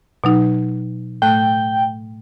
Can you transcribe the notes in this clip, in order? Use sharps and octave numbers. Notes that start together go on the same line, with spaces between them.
B2 F#3 D#4
A2 A3 G5 F#6